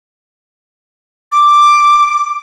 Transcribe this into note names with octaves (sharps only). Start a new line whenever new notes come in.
D6